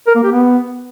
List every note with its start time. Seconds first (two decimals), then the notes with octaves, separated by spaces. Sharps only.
0.07 A#4
0.15 A#3
0.23 G4
0.32 B3